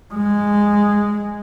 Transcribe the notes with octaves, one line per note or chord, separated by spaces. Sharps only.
G#3